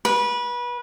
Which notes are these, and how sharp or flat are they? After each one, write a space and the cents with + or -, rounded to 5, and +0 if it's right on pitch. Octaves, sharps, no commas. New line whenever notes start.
B4 -25